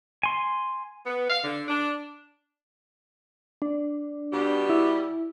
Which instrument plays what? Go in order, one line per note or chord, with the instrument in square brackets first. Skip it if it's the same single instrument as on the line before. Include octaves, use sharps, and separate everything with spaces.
[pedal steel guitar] G#5 C6
[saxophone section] B3
F5
D3
D4
[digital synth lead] D4
[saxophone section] B2 G3 G4
[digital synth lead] E4